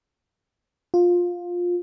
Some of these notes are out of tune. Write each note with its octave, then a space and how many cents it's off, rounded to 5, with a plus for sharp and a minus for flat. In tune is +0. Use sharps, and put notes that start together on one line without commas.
F4 +15